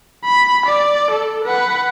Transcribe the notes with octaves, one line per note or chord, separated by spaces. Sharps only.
B5
D5
A4
B4 F#5